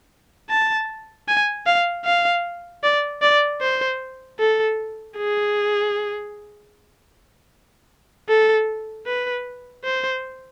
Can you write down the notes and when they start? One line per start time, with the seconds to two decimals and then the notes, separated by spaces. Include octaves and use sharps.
0.50 A5
1.28 G#5
1.66 F5
2.05 F5
2.83 D5
3.22 D5
3.61 C5
4.39 A4
5.17 G#4
8.29 A4
9.07 B4
9.84 C5